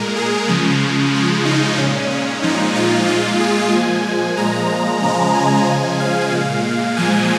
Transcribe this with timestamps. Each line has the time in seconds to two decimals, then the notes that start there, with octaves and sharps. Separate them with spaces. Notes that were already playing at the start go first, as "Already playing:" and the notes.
Already playing: A#2 G#3 A#4
0.16 G#4
0.48 C#3 F3 G#3
1.12 C#3 F3 G#3
1.45 D#4
1.78 A#2 G#3 C#4
2.10 C#4
2.42 A#2 F3 G#3 D#4
2.75 F4
3.07 A#2 G#3 F4
3.40 G#4
3.72 A#2 F3 G#3 G#5
4.05 G#5
4.37 A#2 F3 G#3 A#5
5.02 C#3 F3 G#3
5.34 G#5
5.67 C#3 F3 G#3 G#5
6.00 F5
6.31 A#2 G#3
6.97 A#2 F3 G#3 G#5